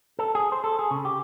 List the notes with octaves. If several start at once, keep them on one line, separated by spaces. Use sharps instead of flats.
A4
G#4
C5
A4
G#4
C#3
G4